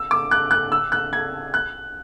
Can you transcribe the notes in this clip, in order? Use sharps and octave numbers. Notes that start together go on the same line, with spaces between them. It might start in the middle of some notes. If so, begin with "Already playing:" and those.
Already playing: E6
D6
F#6
F#6
E6
F#6
G#6
F#6